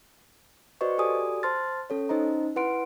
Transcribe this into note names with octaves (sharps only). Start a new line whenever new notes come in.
F#4 B4 C5 D5 D#5 C#6
F#4 G4 A4 D5 G#5 D#6
C5 A5 C6 F6 A6
C#4 A4 C#5
C#4 D#4 C5 D#5 A#5
E4 B4 F#5 C6 D7